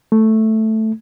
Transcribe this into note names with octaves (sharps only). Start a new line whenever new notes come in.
A3